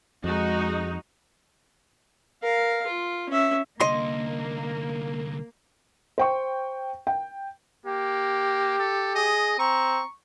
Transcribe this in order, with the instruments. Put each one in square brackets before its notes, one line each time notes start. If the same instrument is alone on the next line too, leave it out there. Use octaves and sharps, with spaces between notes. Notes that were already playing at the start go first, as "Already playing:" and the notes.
[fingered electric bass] F2 [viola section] G#3 D#4 F#4
[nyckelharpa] A#4 F5
F4
C#4 E5
[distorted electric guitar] C2 D3 [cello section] A#3 [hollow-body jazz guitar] D#5 C6
[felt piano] C5 G5 C#6
G5
[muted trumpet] A#3 [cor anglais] G4
[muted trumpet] A4
[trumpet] G#4 [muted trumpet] D#5
[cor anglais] C4 [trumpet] A#5 [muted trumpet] C#6